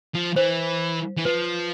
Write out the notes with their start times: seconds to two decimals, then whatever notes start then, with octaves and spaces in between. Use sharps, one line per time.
0.15 F3
0.36 E3 C5
1.17 E3
1.25 F3 B4